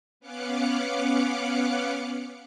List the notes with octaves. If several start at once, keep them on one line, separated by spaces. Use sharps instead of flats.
B3 C#4 F5 D6 F#6 C#7